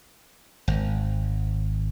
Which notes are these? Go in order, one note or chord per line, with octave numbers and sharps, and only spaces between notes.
G#1